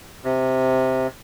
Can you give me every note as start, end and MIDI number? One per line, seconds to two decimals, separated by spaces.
0.24 1.07 48